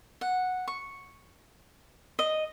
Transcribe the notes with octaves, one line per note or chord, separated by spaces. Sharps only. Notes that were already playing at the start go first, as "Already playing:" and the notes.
F#5
C#6
D#5